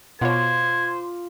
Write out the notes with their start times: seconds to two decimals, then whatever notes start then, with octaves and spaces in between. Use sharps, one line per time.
0.21 B2 F4 C5 C#5 D6 G#6